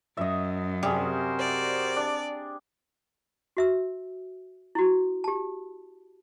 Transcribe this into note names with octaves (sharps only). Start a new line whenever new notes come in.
F#2 D#5 E5
C3 G3 F#4 G#4 A#4 C5
D5
D4
F#4 E5 E6
E4 F#4
G4 A5